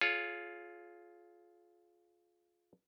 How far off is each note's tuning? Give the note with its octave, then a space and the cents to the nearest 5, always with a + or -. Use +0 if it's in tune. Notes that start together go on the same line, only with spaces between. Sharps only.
F4 +0 G#4 +35 C#5 +0